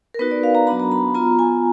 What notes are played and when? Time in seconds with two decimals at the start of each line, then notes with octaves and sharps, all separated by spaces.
0.14 A#4
0.19 B3 D#4 F#4 B4
0.31 D5
0.43 F5
0.55 A#5
0.67 F#3 B3 D4 F#4 B5
0.80 A#5
0.92 B5
1.15 B3 F4 A#5
1.39 G#5